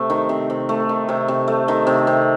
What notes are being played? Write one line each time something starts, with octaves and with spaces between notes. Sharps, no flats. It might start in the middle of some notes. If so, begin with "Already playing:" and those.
Already playing: C3 A3
D#3
C3
C3
A3
D#3
C3
C3
A3
D#3
C3
C3